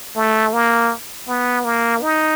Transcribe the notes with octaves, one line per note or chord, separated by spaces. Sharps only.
A3
A#3
B3
A#3
D#4